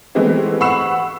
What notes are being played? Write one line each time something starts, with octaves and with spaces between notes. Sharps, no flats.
E3 G#3 A3 B3 C4 E4
F#5 B5 C#6 E6 C7 E7